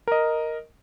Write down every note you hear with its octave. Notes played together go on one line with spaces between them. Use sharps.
A#4 D#5